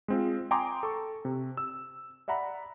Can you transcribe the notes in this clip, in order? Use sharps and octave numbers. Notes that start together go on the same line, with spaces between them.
G#3 C4 F4
G5 G#5 A#5 C6 D6 D#6
A4 C#6
C3
E6
D5 E5 F#5 A#5 B5